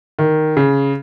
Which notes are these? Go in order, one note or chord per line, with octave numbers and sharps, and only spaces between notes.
D#3
C#3